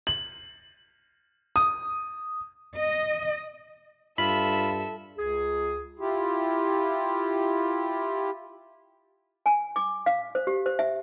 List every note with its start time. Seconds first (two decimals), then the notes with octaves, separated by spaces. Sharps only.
0.07 F#7
1.56 D#6
2.77 D#5
4.18 G2 F4 A4 E5 B5
5.17 C#2 G#4
5.97 E4 F4 G4
9.46 G#5
9.76 D6
10.06 F5
10.35 C5
10.47 G4
10.66 C5
10.79 E5